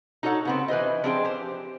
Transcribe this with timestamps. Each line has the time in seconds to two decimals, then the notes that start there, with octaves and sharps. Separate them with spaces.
0.23 D#4 F#4 A4 C#5 F#5
0.45 C#3 B3 C4
0.68 E3 B4 C5 D#5
1.04 F3 C4 D4 G#4 C5 G5
1.25 G4 C5